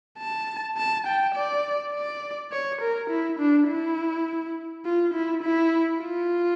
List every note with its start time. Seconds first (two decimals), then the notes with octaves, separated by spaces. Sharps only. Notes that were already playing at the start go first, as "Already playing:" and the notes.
0.19 A5
0.77 A5
1.06 G5
1.35 D5
1.93 D5
2.52 C#5
2.81 A#4
3.10 E4
3.39 D4
3.68 E4
4.85 F4
5.14 E4
5.43 E4
6.01 F4